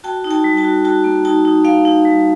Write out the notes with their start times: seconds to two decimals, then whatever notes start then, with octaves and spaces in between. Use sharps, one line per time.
0.04 F#4 G5 A5
0.24 D#4
0.31 G5 A5
0.44 G3
0.57 G5 A5
0.65 F#4
0.85 F#4 G5 A5
1.04 A#3
1.25 D#4 G5 A5
1.45 D#4
1.65 A#3 F5 G5
1.85 D#4
2.05 G3